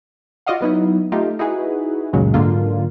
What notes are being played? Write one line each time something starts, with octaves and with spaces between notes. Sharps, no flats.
F4 F#4 D5 D#5 F5 F#5
F#3 B3 D#4 E4
A3 D#4 F4 G4
D#4 E4 F#4 G#4 B4
C#2 F#2 A#2 C#3 F#3 G#3
G#2 D3 F#3 A#3 F4